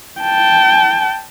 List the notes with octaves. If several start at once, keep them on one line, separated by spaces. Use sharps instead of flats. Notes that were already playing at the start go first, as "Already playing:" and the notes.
G5 A5